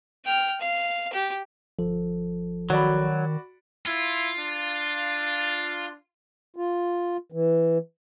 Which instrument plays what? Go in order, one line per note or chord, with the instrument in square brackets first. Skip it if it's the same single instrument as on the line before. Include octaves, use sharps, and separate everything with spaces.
[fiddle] G5 F6
F5
G4
[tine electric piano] G1 F3 A4
[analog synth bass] D#3 [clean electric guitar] F#3 [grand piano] F#4 D5 B5
[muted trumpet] E4 [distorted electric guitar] F4
[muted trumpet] D4
[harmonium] F4
E3